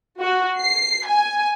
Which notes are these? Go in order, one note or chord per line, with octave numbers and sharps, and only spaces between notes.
F#4
C7
G#5